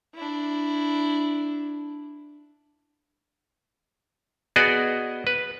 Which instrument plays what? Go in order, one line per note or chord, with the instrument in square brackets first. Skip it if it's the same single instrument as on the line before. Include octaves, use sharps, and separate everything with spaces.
[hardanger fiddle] D4 E4
[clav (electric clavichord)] B3 F#4 G#4 D5 D#5
B4